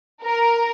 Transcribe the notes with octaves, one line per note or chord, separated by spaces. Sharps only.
A#4